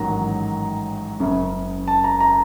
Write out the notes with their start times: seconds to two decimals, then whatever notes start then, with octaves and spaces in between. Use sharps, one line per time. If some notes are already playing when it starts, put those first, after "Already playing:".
Already playing: A1 G#2 D#3 F#3 A#5
1.20 F#1 F#2 C#3
1.88 A5
2.04 A#5
2.20 A#5